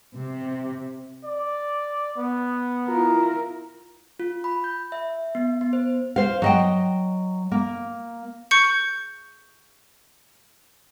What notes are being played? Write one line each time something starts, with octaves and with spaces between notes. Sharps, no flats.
C3
D5
B3
E4 F4 A#4
F4
B5
G6
E5
B3
B3
C5
C5 F5
F#3 D#5 G5
A#3
C#6 G6 C#7